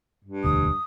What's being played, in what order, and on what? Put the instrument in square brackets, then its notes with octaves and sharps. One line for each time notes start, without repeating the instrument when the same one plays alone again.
[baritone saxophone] G2
[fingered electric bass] E1 D2 [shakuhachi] D#6